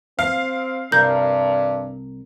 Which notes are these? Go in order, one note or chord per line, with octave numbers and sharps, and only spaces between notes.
C4 F5
C2 G2 A#4 G6